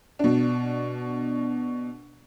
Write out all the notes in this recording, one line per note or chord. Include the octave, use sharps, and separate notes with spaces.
B2 D4